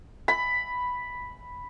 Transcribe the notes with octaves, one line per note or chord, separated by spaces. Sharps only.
B5